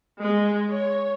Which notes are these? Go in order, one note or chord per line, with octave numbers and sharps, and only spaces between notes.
G#3
C#5